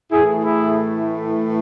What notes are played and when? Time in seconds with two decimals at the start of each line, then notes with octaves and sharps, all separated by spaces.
0.12 A2 E3 A3 E4 G#4
0.44 E4 G#4